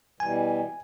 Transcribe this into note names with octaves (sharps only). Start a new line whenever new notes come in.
B2 E3 G3 G#5